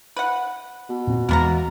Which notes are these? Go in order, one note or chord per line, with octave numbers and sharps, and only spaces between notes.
B4 F#5
B2
A#2 C4
E2 E3 G#3 A#3 B3 A#5